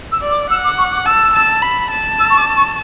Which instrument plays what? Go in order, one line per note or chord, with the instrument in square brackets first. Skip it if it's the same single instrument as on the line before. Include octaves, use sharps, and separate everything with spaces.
[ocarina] E6
[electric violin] D5
[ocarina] D6
[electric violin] F#5 [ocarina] E6
[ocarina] D6
C#6
D6
[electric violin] A5 [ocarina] E6
[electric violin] A5
B5
A5
[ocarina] E6
C#6
D6
C#6